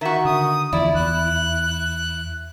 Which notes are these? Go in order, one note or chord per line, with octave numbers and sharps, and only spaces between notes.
D#3 F#4 E5
D3 D#6
E2 D3 F3 E4 D5
E2 F#6